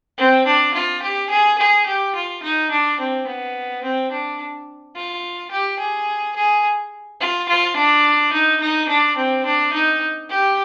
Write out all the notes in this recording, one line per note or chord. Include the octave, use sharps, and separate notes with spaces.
C4
D4
F4
G4
G#4
G#4
G4
F4
D#4
D4
C4
B3
C4
D4
F4
G4
G#4
G#4
F4
F4
D4
D#4
D#4
D4
C4
D4
D#4
G4